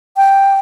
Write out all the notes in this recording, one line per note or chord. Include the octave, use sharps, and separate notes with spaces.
G5